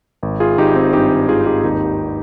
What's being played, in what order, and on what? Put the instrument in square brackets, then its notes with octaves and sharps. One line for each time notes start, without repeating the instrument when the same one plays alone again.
[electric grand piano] G#1
F4 G#4
G#1 D#4 G4
C4 D#4
G2 D#4 G4
G#1 F4 G#4
D#4 G4
D#2 D#4 G4